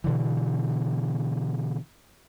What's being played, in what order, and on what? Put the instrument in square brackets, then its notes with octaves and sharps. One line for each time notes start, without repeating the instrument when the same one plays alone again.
[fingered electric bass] B2 D3 E3